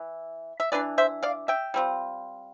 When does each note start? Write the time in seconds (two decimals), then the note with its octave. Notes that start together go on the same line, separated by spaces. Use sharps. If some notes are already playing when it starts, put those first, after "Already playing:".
Already playing: E3 E4
0.60 E5
0.72 E3 B3 D4 B4 D5
0.98 C5 E5
1.23 D5 F5
1.48 E5 G5
1.74 G3 C4 F4